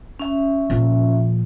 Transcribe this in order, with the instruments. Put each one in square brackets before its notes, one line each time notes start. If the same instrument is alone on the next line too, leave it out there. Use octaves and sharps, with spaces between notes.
[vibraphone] C#4 E5
[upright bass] A#2 F3